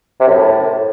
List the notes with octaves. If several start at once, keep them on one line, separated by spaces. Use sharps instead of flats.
C3
F#2
A2